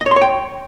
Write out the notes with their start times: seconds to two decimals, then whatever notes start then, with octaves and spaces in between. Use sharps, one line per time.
0.01 D#5
0.06 C#5
0.11 C6
0.16 C#5
0.21 G5